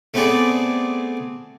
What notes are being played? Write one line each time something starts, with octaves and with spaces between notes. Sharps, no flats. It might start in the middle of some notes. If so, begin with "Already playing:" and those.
A3 B3 C4 G#4 D5